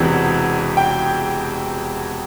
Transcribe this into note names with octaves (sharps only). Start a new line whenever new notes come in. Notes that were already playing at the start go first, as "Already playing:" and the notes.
Already playing: E1 E2 C3 E3 F#5
G5